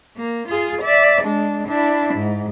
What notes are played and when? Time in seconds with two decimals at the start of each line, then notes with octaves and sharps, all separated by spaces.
0.16 A#3
0.48 F4 G#4
0.82 D5 E5
1.22 G#3 D4
1.68 D4 E4
2.15 G#2